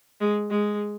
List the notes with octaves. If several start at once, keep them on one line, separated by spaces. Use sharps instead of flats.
G#3
G#3